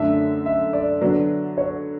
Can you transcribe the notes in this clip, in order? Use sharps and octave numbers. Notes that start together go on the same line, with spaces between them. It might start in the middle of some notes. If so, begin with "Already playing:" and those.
Already playing: F#2 D3 A3 D4 E5
E5
D5
D3 F#3 B3 D5
C#5